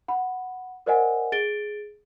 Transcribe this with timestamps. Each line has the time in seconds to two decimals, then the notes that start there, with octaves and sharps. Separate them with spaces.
0.08 F#5 B5
0.86 A#4 C5 D5 D#5 F#5 G#5
1.32 G#4 A6 D7 G7